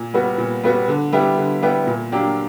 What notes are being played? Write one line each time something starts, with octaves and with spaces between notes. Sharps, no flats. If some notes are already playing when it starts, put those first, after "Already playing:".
Already playing: A#2
G3 B3 F#4
A#2
G3 B3 F#4
D3
G3 B3 E4 G4
D3
G3 B3 E4 G4
A#2
F#3 A#3 D4 G4